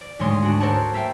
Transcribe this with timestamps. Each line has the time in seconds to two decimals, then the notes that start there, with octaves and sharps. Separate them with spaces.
0.01 D5
0.19 D2 G#2 G#3 C#5 C6 D#6
0.42 D4 F#4
0.60 A4 A#4 C5 C#5 F#5 A5
0.93 A#3 E5 F5 G5